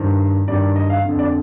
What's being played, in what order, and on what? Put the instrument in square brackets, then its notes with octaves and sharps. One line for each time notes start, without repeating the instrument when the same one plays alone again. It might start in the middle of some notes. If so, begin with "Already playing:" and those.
Already playing: [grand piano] G2 D#3 C5
G2 D#3 D5
D#5
F5
F2 D3
D5